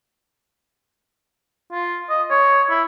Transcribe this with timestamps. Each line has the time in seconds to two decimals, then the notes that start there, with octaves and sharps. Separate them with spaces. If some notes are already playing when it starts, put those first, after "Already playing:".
1.72 F4
2.10 D#5
2.31 C#5
2.70 E4